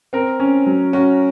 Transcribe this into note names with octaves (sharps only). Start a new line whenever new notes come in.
C4 A#4
C#4
F#3
C#4 F#4